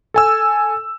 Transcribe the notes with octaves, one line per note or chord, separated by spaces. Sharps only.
A4 G#5 E6